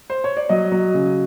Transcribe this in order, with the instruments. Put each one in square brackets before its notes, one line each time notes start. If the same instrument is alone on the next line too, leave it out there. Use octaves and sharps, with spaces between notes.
[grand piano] C5
C#5
D5
F#3 D#5
F#3
C#3